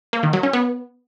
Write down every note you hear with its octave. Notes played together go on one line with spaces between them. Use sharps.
A#3
D#3
F#3
C#4
B3